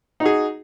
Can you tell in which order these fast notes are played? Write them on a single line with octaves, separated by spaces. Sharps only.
D#4 F#4 G#4